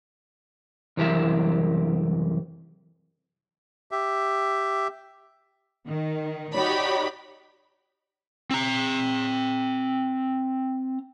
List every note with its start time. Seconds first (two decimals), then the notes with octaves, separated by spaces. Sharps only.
0.97 C2 F#2 E3 G4 A#4 E5
3.91 G4 E5
5.86 D#3
6.53 D#4 F#4 G4 C#5 D5 B5
8.51 C4 A#5